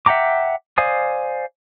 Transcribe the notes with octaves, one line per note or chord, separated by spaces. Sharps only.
E5 F#5 G5 A#5 D6
C5 D5 F5 G#5 D#6